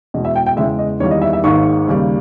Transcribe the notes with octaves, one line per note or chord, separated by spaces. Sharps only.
E2 B2 G#3 D#5
E5
G5
G5
E2 C#3 E3 G#3 E5
D#5
E2 D#3 G3 A#3 C#5
D#5
E5
E5
G#1 G#2 D#3 A#3 C#6
D#2 C#3 G3 A#3